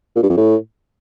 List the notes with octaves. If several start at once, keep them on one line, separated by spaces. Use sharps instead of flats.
A#2
G2
F2
A2